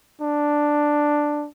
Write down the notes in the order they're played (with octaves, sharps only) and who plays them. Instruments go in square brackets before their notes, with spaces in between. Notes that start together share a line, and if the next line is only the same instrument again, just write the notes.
[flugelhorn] D4